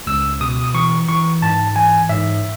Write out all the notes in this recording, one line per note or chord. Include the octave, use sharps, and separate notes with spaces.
C#2 E6
B2 D#6
D#6
E3 C#6
E3 C#6
G#2 A5
E3 G#5
G#2 E5